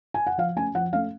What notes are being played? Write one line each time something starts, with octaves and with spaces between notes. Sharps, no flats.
G#5
F#5
F3 F5
A3 C#4 G#5
F3 F#5
A3 C#4 F5